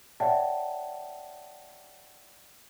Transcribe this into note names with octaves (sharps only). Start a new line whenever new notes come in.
C#5 D5 E5 F#5 G5 A5